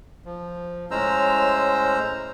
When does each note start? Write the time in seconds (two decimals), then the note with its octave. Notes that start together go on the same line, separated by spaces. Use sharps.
0.25 F3
0.91 A2 G#3 C#4 C5 A#5 E6